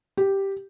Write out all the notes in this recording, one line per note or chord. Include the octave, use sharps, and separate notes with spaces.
G4